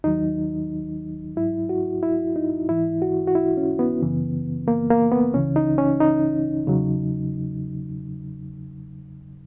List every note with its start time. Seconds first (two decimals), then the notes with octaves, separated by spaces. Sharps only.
0.04 D#2 D#3 F#3 D#4
1.36 G#2 F#3 E4
1.69 F#4
2.03 E4
2.36 D#4
2.69 G#2 E3 E4
3.02 F#4
3.27 F#4
3.35 E4
3.57 C#4
3.79 B3
4.02 F#2 C#3 E3
4.68 A#3
4.90 A#3
5.11 B3
5.34 C#2 C#3 E3 C#4
5.56 D#4
5.78 C#4
6.00 D#4
6.67 E2 C#3 F#3